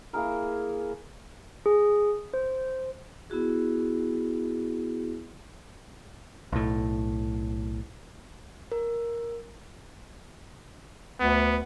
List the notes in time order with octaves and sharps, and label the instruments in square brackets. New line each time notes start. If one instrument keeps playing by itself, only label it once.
[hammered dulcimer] A#3 E4 G#4 A#4
[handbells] G#4
C5
[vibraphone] B3 E4 F#4 G#4
[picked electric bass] B1 A2
[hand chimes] A#4
[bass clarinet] D2 [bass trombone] B3